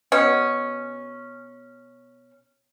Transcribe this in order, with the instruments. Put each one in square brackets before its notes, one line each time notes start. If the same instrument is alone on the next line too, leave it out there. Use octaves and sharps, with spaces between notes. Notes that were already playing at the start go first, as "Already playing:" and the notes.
[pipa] B2 C#4